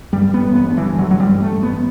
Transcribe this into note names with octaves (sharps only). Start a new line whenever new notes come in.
G2 G3
B3
A1
B3
G2
E3
A1 F#3
F#3
G3
G2
A3
A1
B3